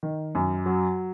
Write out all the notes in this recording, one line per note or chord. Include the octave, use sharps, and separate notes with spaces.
D#3
F#2
F#3